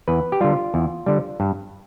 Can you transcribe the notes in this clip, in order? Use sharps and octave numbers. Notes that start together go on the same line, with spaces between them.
E2 B4
G4
D3 G3 F4
E2
D3 G3
G2